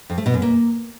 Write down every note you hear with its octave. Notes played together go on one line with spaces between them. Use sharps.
F2
A3
B2
F#2
A#3